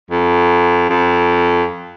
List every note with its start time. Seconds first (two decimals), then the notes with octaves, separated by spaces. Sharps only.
0.11 F2
0.90 F2